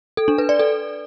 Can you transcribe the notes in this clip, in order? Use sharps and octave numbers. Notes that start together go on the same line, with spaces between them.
A4
D4
B4
D5
A4